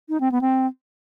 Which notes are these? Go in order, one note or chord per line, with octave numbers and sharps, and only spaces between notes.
D#4
C4
B3
C4